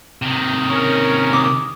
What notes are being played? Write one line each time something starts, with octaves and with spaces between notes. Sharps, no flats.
C3 D#3
C#4 A#4
D6 D#6